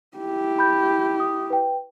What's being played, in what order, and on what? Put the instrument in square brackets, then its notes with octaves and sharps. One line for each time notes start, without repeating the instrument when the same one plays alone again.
[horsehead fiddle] E4 G4
[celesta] B5 G6
D#6
B4 G5